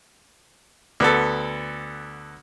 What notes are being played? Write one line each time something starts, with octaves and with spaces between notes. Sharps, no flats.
D2 B3 A4